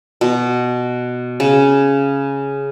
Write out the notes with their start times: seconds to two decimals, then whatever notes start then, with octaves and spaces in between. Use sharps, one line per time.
0.21 B2
1.40 C#3